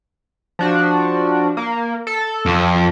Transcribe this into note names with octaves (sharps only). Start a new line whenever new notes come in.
F3 D4 F#4
A#3
A4
F2